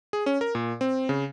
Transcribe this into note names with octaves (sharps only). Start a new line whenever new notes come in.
G#4
C#4
A#4
A#2
C4
C#3